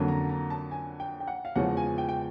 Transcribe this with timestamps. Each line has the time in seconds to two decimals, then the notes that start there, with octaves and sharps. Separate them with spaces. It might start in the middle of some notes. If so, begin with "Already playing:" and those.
Already playing: F2 D3 F#3 A#3 C#4
0.08 A#5
0.29 A#5
0.50 A5
0.71 G#5
1.00 G5
1.20 G5
1.28 F#5
1.45 F5
1.56 E2 C#3 F3 G#3 C#4 F#5
1.77 G#5
1.98 G5
2.09 G5